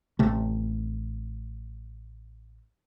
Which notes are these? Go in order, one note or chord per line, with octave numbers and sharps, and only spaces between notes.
A1 C3 A3